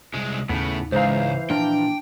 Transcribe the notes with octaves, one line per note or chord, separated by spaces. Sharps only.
C2 G#3
D#2 A2 C#3 B3
C#2 G#2 E3 G#3 C5 F5 A#5
A#2 F3 D4 A#4 G5